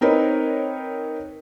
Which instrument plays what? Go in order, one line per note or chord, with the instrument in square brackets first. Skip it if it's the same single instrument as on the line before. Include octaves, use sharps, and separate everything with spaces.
[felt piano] C4 D#4 A#4 B4 C#5